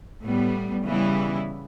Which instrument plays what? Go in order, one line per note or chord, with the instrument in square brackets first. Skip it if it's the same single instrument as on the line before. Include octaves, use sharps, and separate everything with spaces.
[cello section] A2 G3 B3
C#3 E3 G3 B3 E4